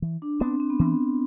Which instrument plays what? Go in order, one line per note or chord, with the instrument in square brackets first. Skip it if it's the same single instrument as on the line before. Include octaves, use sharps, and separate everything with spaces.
[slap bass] E3
[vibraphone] D4
[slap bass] B3 D4 [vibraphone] C4
[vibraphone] C4
B3
[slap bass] E3 [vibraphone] C4